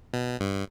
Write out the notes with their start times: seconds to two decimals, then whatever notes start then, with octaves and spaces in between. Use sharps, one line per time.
0.13 B2
0.40 G2